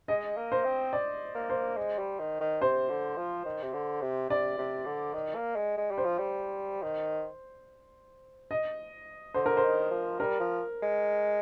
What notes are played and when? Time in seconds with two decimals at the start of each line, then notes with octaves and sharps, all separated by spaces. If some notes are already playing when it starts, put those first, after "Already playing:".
0.08 G#3 D#5
0.37 A#3
0.52 C5
0.65 C4
0.93 D5
1.35 A#3
1.50 C5
1.77 G#3
1.98 G3
2.19 D#3
2.40 D#3
2.61 C3 C5
2.90 D3
3.18 F3
3.46 D#3
3.63 C3
3.74 D3
4.02 C3
4.30 C3 D5
4.58 C3
4.86 D3
5.14 D#3
5.36 A#3
5.56 G#3
5.77 G#3
5.91 G3
5.98 C5
6.05 F3
6.19 G3
6.83 D#3
8.51 D#5
9.34 D3 C5
9.46 A#4
9.57 C5
9.63 D#3
9.91 F3
10.19 G3 A#4
10.40 F3
10.82 G#3